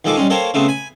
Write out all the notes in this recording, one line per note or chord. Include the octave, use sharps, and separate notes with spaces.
D#2 F3 G#3 A4 D6
G3 G#3 C#4
A#3 A4 C5 C#5 G5
C#3 A3 B3 C4
G#5 B5